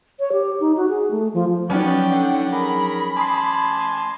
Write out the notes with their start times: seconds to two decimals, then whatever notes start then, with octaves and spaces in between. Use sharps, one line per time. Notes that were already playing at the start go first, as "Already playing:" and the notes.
0.20 C#5
0.32 G4
0.60 D#4
0.77 F#4
0.89 G#4
1.11 A3
1.34 F3
1.70 F3 F#3 B3 C#4 D#4 B4 D5 G5
2.10 D3 F#5 D6
2.53 G#4 A#4 B5
3.17 G#5 A5 C6 D6 D#6 C7